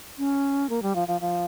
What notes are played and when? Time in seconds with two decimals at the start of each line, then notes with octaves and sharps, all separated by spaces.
0.18 C#4
0.70 A#3
0.82 G3
0.95 F3
1.08 F3
1.21 F3